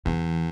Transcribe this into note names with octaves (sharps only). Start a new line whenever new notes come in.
E2 E3